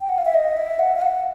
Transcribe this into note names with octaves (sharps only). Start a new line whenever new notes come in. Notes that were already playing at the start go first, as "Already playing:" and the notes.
G5
F#5
F5
E5
D#5
E5
F#5
F5
F#5